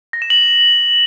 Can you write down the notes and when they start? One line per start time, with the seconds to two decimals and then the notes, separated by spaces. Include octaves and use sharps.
0.13 A#6
0.22 E7
0.30 F#7